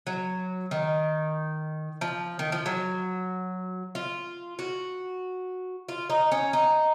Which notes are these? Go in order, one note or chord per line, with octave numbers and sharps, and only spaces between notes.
F#3
D#3
F3
D#3
F3
F#3
F4
F#4
F4
D#4
C#4
D#4